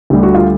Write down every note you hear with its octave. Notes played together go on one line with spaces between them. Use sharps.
D2 D3 G3 G4
F#4
F4